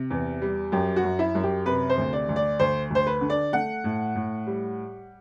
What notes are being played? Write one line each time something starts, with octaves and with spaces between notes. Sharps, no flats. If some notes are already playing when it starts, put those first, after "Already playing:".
Already playing: C3
E2
G3
F#2 G4
F#4
F#2
E4
F#2
G4
C3 B4
C5
D2
D5
D2
D5
D2 C5
D2 C5
B4
D3
D5
A3 F#5
A2
A2
G3